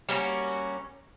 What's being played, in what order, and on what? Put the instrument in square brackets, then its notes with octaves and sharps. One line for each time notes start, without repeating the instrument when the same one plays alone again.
[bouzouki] G3 A#3 C#4 F#4